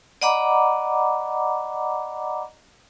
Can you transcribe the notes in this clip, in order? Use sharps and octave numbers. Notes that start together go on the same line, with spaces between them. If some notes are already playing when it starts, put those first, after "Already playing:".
D5 D#5 F#5 A#5 B5 D6